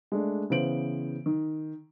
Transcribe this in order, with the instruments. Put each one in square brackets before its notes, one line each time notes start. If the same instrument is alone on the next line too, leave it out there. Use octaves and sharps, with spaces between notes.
[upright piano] G#3 A3 D4
C#3 E3 B3 C5 D7 F#7
D#3